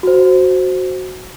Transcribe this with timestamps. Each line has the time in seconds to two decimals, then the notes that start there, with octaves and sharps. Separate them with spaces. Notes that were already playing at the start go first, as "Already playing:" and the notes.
0.03 F#4 C5